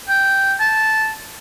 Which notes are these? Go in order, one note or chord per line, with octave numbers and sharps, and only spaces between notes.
G5
A5